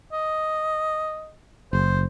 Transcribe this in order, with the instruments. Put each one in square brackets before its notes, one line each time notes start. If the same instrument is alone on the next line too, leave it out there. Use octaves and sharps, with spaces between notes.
[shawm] D#5
[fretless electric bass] F#1 [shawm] C5